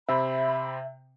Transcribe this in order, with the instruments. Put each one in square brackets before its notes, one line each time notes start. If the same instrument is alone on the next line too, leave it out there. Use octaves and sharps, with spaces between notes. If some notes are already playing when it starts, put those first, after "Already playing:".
[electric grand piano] C3 C4 [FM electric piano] E5 [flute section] B5